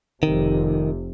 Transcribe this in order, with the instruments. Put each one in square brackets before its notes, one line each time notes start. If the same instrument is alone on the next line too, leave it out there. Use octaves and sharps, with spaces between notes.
[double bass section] F1 C3 [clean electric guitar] D#3